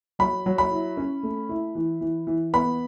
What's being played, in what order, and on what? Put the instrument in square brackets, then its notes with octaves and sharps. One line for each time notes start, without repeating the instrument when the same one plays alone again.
[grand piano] F#3 B5
F#3
B5
E4
C#4
A3
E4
E3
E3
E3
B3 B5